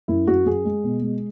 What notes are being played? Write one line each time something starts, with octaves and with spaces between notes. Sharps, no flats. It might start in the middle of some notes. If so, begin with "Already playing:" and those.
F#2 E4
F#2 F#4
F#2 G#4
G#3
B2
G#3